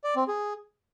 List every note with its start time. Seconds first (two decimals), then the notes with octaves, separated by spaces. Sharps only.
0.04 D5
0.16 C4
0.28 G#4